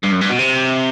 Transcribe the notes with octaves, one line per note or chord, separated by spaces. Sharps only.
G2
F#2
G2
B2
C3